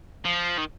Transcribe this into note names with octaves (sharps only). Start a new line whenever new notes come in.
F3
D#3